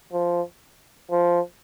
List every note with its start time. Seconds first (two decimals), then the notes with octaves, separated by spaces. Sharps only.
0.12 F3
1.11 F3